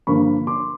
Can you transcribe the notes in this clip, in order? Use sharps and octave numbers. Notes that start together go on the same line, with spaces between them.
G2 D3 F3 A#3 B5 C#6
C6 D6